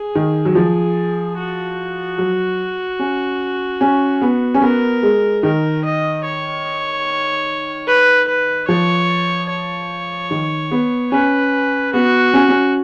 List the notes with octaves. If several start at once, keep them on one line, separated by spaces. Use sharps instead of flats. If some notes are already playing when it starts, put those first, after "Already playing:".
Already playing: G#4
D#3
F#3
F3 G#4
F#4
F#3
C#4
C#4
B3
C#4
B3 A#4
G#3
D#3 A#4
D#5
C#5
B4
B4
F3 C#5
C#5
D#3
B3
C#4 B4
B3 F#4
C#4
C#4